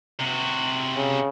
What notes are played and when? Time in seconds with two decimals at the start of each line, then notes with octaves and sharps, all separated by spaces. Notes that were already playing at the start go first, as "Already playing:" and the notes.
0.19 C3 F#4
0.97 C#3